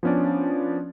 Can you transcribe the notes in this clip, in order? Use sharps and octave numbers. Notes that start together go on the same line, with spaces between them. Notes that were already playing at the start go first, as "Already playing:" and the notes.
F3 B3 C#4 D4 D5